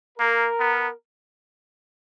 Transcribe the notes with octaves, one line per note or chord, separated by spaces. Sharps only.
A#3 A#4
B3